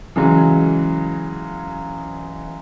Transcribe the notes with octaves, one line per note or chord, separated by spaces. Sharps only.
C#3 E3 F#3 G#3